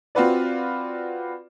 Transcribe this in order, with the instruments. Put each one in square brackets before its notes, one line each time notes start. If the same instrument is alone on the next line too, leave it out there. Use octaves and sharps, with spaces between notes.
[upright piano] C4 F4 F#4 B4 D5